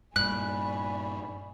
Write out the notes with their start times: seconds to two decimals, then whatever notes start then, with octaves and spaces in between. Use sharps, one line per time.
0.16 G2 A#2 D5 G#5 B5 C#6 F#6